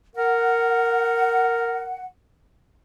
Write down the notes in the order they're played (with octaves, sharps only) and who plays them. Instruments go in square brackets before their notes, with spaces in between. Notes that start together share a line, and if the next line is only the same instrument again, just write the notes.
[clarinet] A#4 [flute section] F#5